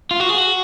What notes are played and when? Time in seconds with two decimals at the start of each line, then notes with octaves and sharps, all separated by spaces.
0.11 F4
0.20 F#4
0.29 G#4
0.38 F#4